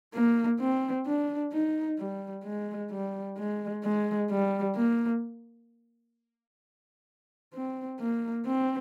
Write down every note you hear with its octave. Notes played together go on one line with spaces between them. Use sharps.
A#3
C4
D4
D#4
G3
G#3
G3
G#3
G#3
G3
A#3
C4
A#3
C4